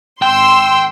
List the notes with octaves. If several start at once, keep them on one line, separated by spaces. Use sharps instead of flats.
G#1 G5 C6 E6